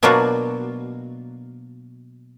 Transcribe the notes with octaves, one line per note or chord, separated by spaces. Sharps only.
B2 F#3 A#3 D4 F4 F#4